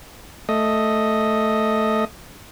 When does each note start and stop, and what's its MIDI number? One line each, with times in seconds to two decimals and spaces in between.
0.49 2.05 57
0.49 2.05 75